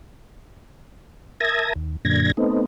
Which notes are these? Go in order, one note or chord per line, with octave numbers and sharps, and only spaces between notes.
A#4 E5 A5 D#6 G#6 A#6
D#2
F#2 A#2 D3 G#6 A#6
A3 B3 C4 D#4